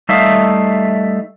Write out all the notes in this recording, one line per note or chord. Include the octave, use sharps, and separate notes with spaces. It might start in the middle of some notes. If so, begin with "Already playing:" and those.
G3 A3 D#4 E5 F5